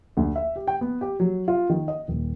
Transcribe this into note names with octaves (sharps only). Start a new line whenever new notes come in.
D2
E5
G4
G5
B3
G4
F#3
F4
D#3
D#5
D#1